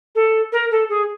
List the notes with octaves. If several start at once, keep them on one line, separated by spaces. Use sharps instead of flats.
A4
A#4
A4
G#4